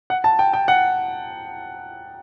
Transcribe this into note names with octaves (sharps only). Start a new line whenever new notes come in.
F#5
A5
G5
G5
F#5